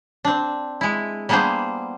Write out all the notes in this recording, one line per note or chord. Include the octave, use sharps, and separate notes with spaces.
C4 D4
G#3 E4
G3 A#3 B3 D4 G#4 C5